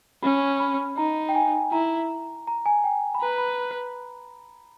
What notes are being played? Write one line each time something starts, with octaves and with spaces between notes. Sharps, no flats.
C#4 B5
B5
D#4 A#5
G5
G#5
E4 A#5
A#5
G#5
G5
B5
B4 A#5
B5